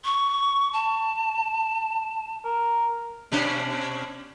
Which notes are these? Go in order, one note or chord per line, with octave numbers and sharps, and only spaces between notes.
C#6
A5
A#4
B2 C#4 D4